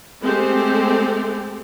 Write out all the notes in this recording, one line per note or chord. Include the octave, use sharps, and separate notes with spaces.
G#3 A3 C4 G4 A4 C5